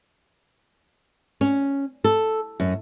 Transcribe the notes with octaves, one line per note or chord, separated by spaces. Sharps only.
C#4
A4
F#2